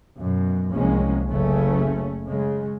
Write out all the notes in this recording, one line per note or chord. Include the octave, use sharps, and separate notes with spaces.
F#2 B2
C2 F3 F#3 G#3 A#3 C#4
F#1 C#3 A3 C#4
C#3 G#3